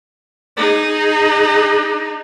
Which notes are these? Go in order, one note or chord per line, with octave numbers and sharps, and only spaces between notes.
D#4 G#4